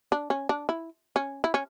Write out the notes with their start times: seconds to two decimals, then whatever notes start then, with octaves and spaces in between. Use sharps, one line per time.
0.12 D4
0.30 C#4
0.49 D4
0.69 E4
1.16 C#4
1.44 E4
1.54 C#4